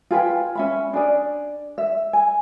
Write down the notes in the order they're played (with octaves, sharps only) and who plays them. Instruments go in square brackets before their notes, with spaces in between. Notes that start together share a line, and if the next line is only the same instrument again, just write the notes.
[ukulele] F4 G#4 B4 G5
C#4 E5 B5
D4 G#4 D5
E5
G#5